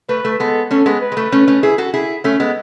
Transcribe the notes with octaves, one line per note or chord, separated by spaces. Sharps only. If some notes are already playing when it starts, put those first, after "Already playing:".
A3 B4
A3
G#3 B3 A4
A3 C#4 A4
G#3 B3
B4
G#3
A3
A3 C#4
A3 C#4
E4 G#4
F#4 A4
E4 G#4
A3 C#4
G#3 B3